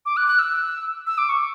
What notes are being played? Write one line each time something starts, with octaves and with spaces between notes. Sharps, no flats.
D6
F#6
F#6
E6
E6
D6
C#6